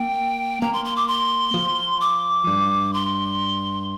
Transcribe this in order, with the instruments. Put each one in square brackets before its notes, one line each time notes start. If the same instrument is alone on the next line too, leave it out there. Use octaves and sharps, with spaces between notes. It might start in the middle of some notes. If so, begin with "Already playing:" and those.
Already playing: [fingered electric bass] A#3 [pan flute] G5
[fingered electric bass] A#3 [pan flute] A#5
[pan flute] C6
C6
D6
C6
[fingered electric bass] F3
[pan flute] D6
[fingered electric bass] G2
[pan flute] C6